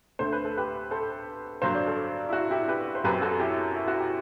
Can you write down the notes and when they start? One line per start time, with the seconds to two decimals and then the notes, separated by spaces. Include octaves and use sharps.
0.19 D2 D3 A3 C5
0.33 B4
0.45 A4
0.57 G4 B4
0.91 A4 C5
1.62 G2 D3 F#3 C5
1.74 D5
1.87 A4 C5
2.29 E4
2.32 F#4
2.51 E4 G4
2.68 G4 B4
2.95 C5
3.04 F#2 F#3 C4 G4 B4
3.22 F#4 A4
3.40 E4 G4
3.75 E4
3.87 F#4
3.99 E4 G4